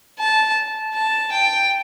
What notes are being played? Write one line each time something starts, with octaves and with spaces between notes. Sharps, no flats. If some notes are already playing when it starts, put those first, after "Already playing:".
A5
A5
G5